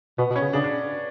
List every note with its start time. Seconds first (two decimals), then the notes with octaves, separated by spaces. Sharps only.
0.18 B2 B3
0.30 B2
0.36 C#4
0.41 C#3
0.53 C#3 D4
0.64 D4